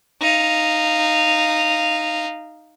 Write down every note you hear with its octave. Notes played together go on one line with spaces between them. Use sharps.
D#4 F5